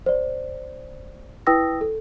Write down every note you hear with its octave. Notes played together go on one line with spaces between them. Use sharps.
C5 D5
E4 B4 G5 D#6 E6 A#6
A4